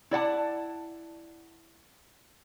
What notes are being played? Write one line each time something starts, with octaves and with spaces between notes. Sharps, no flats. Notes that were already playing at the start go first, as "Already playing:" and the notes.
E4 D5 F#5 A5